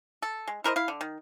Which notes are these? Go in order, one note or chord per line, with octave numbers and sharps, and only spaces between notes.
A4
G#3
E4 A#4 C5 D#5
E4 F5
D3
D#3